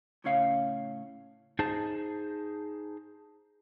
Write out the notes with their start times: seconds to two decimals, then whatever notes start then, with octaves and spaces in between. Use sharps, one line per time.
0.24 A2 C#3 C#4 C#5 F5
1.59 D#4 G#4 C5 A5